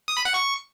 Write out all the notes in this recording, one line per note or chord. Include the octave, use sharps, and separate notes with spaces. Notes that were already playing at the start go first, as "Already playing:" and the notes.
D#6
B5
F#5
C#6